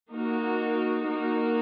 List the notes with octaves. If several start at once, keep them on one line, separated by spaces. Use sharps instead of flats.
A#3 D#4 F#4 A#4
A#3 D#4 F#4 A#4